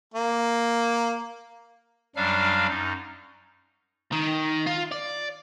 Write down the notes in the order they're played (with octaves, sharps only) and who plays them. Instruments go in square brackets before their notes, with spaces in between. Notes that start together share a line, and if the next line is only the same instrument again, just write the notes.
[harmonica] A#3
[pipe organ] F#2 F#3 G3 D4 F5 F6
F#2 D#4
[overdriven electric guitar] D#3
F4
D5